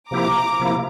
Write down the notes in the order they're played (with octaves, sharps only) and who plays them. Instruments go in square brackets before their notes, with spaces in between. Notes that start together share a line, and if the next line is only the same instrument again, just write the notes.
[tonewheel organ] C3 F3 A#3 E4 G4 [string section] A#5 D6
[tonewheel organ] C3 F3 A#3 E4